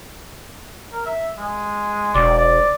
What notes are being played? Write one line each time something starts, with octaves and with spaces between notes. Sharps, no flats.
A#4
E5
G#3
E1 D5
D5